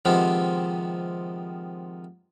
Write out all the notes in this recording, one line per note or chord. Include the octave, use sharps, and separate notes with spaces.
C3 D#3 F3 G#3 B3 C4